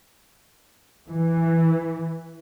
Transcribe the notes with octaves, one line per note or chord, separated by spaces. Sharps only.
E3